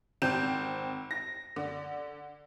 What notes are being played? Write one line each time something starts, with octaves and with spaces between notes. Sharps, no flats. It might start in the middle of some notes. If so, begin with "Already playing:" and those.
G#1 C4 G6 E7
A#6
D3